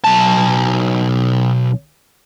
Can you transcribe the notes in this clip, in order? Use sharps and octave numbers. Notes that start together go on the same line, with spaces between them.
B1 A5